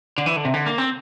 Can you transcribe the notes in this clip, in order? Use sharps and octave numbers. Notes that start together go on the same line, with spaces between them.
D3
E3
D3
C3
D3
A#3
C4